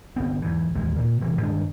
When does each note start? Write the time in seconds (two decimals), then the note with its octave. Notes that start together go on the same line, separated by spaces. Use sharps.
0.16 G1 B3 C4
0.42 E2 G#2 E3
0.75 A1 D#2 B2 G#3
0.99 A#2
1.21 E1 C3 E3
1.41 G2 D#3 G#3 D4